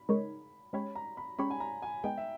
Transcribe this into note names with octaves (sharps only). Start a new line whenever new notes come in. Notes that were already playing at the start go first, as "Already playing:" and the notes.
Already playing: B5
C#3 G#3 D#4 A#4 C#5
G#3 C#4 G4 C#5 B5
A#5
B5
G#3 C#4 G4 C#5 B5
G#5
A#5
G#5
G#3 B3 D#4 G5
E5